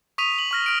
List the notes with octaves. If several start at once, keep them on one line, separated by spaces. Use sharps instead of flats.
C#6 D#6 B6 D#7 F7
F#7
C#6 F6 A#6
F6 D7